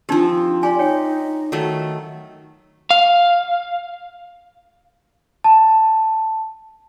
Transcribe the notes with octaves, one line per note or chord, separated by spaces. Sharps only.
F3 C4 D4 D#4 G4
G4 D5 G#5 C6
D#4 C#5 G5
D#3 F#3 A3 F#5
F5
A5